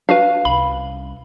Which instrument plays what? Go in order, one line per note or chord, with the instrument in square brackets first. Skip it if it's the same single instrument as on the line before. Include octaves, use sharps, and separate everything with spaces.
[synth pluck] D4 F#4 B4 [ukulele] F5
[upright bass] C2 C#4 [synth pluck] B5